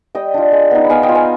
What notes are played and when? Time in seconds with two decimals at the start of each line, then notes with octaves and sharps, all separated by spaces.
0.15 G3 D#5 G5
0.34 D4 F4
0.52 G#3
0.71 B3 D#4
0.84 B5
0.90 B3 F5 G#5
1.03 D#5 G5
1.09 F4
1.15 F5 G#5